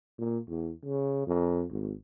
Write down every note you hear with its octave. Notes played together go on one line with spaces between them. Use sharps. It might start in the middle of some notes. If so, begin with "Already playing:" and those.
A#2
E2
C#3
F2
G#1